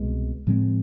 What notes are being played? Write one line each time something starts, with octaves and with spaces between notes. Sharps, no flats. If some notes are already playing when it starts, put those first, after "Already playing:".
Already playing: C2 B2 G#3
A2 F3 G#3 C4